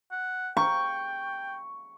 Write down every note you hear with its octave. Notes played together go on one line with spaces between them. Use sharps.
F#5
G5 C#6